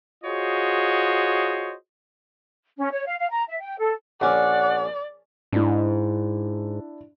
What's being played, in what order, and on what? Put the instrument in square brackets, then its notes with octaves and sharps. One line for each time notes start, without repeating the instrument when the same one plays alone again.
[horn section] F4 F#4 G#4 C5 C#5 D#5
[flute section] C#4
C#5
F5
F5
A#5
E5
G5
A4
[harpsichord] A#1 C#4 D6 [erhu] D5 [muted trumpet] F#5
[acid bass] G#2 [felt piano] D4 E4